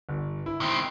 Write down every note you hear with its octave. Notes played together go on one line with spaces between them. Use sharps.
G1
E4
D#3 C4